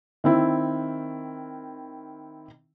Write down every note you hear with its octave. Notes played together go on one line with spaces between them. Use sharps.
D#3 C4 E4